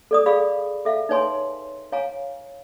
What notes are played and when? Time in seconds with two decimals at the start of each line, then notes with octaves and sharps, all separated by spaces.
0.11 A4 D5 D#6
0.26 G#4 D5 F5 B5
0.85 A4 E5 F5
1.09 D#4 B4 C#5 G#5 C6
1.92 C#5 F5 G#5 A#5